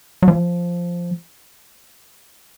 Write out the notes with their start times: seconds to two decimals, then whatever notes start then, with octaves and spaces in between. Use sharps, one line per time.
0.23 F#3
0.28 F3